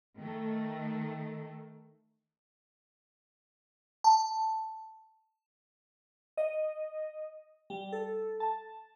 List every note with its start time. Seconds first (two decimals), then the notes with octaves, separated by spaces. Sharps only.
0.15 D#3 A3
4.04 A5
6.37 D#5
7.70 G3
7.92 A4
8.40 A5